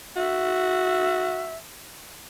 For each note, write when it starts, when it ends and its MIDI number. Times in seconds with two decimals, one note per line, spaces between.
0.16 1.52 66
0.16 1.56 76